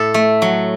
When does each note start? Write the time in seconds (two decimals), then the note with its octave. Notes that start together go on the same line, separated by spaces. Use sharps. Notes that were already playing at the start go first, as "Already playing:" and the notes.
Already playing: A2 A4
0.14 A3
0.42 F#3